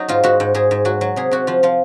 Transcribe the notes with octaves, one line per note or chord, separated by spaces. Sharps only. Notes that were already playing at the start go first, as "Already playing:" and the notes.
Already playing: F#3 D#4
G#2 F4
G#2 F#4
G#2
G#2 G#4
G#2
F#3 F#4
F#3
C3 G#4
C3 F#4
F3 F4
F3 F4